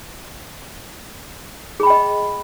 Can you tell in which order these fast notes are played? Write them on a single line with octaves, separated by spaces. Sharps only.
G#4 B5 G5 D#5